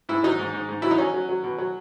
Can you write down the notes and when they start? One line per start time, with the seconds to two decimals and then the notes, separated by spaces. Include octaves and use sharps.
0.09 G#2 E4
0.24 F#3 D#4
0.39 G#2
0.54 G#2
0.69 G#2
0.82 F#3 E4
0.91 D#4
0.98 F#3 C#4
1.14 F#3
1.29 F#3
1.44 B2
1.58 F#3